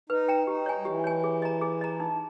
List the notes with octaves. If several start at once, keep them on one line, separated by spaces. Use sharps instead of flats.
D#4 B4
G5 A#5
D#4 G4
C#5 G#5
G3
E3 G4
C#5 G#5
G#4
D#5 A#5
G#4
D#5 A#5
D#4